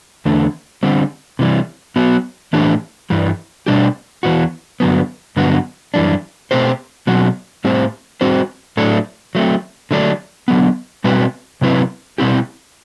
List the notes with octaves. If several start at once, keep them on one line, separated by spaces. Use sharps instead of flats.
E2 D3 A3
D3 G3 C4
C3 E3 G3
F#3 B3 F#4
A2 E3 A3 D4 G4
G2 E3 G3
B2 G3 D4 G4
E2 C3 E3 B3 F#4
G2 D3 F#3 B3
G2 D3 F#3 B3 F#4
F#2 E3 G3 D4
B2 A3 C4 G4 C5
B2 F#3 C4 F#4
A2 G3 C4 G4 C5
G3 C4 F#4 C5
A2 F#3 A3 D4 A4
F#3 A3 C4
D3 F#3 A3 D4 G4
D3 F#3 B3
B2 G3 C4 F#4 B4
C3 F#3 C4 E4 B4
B2 G3 C4 E4 G4